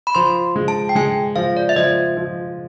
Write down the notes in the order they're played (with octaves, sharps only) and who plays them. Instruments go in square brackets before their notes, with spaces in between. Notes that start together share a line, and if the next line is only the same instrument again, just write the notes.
[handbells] B5
[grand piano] F3 [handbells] C6
[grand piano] G#3
[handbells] A5
G5
[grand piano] G#3 [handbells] G#5
[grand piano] F3 [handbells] F5
[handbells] D5
E5
[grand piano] F3 [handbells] D#5
[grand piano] F3